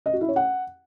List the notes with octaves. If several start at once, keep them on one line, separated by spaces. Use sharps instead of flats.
D#5
F#4
E4
C#5
F#5